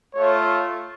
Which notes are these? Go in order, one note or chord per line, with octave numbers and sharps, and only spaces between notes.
A3 F4 C#5